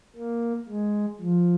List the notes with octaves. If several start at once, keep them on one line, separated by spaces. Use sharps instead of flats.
A#3
G#3
F3